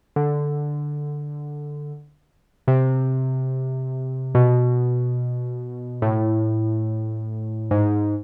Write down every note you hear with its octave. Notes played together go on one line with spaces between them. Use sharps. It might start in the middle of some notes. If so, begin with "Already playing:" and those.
D3
C3
B2
A2
G#2